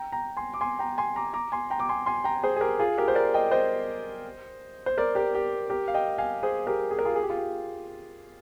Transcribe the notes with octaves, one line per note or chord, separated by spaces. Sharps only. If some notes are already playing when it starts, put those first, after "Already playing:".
Already playing: G5 A#5
G5 A#5
G#5 C6
D6
G#5 C6
G5 A#5
G#5 C6
A#5 D6
A#5 D6
G#5 C6
G5 A#5
D6
G#5 C6
G#5 C6
G5 A#5
G#4 C5
G#4
G4 A#4
F4 G#4
G4 A#4
C5
A#4 D5
D#5 G5
C5 D#5
C5
A#4 D5
G4 A#4
G4
G4 A#4
F5
D#5 G5
F5 G#5
G#4 C5
G4 A#4
G#4
A#4
F4 G#4
G#4
G4
F4
G4